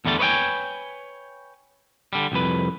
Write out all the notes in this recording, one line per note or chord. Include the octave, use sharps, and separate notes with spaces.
E2 D3 G3 A3 A5
B4 C#5 D#5 G5 G#5
D3 G3
C2 F2 B4